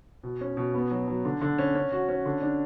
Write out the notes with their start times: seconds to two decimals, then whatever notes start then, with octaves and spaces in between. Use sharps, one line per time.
0.23 B2
0.41 C#4
0.57 B2
0.74 B3
0.91 F#3
1.08 F#3
1.25 D3
1.41 D3
1.58 C#4
1.75 C#4
1.92 F#4
2.09 C#4
2.25 D3
2.42 D4